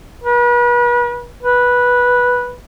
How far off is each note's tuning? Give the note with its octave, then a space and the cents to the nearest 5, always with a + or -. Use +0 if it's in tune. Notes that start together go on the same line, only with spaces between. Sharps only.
B4 -40
B4 -10